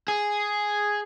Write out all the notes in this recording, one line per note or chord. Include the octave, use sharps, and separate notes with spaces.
G#4